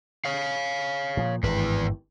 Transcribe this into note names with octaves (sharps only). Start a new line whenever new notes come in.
C#5 F5
A#2 F3
G#1 E2 G2 E3 B4